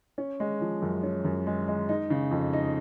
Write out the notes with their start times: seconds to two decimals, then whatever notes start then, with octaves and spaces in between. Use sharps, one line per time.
0.18 C#4
0.40 G#3
0.61 F3
0.82 F#2
1.03 C#4
1.25 F#2
1.47 G#3
1.68 G#3
1.89 D#4
2.10 C#3
2.31 F2
2.53 D#4